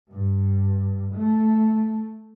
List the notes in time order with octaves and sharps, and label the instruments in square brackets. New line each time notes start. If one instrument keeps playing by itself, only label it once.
[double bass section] G2
A3